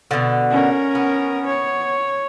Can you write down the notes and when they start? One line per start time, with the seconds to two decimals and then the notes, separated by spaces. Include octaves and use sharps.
0.11 B2 D3
0.50 C#4 A#4
0.95 B3
1.46 C#5